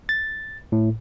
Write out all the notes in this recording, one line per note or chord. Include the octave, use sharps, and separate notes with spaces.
A6
A2